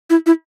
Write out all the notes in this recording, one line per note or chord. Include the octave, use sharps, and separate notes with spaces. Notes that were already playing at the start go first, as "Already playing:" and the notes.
E4
E4